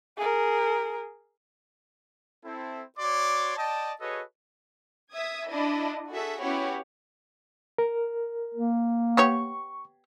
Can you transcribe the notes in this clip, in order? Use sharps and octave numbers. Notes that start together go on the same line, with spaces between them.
G#4 A#4
C4 E4 A4
F#4 C#5 D5 C6 D6
D5 D#5 G5 A5
F#4 G#4 A4 B4 C#5 D#5
E5 D#6 G#6
D4 E4 D#5
F#4 G#4 A4 E5
B3 C#4 E4 F#4 G4 C#5
A#4
A#3
B3 G4 C#5 C#6